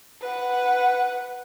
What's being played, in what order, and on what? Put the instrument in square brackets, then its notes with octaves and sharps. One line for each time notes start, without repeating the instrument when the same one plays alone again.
[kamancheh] B4 F#5